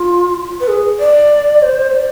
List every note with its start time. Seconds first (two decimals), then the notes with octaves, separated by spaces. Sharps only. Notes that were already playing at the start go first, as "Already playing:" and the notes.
Already playing: F4
0.60 B4
0.68 G#4
0.99 D5
1.62 C5
1.94 D5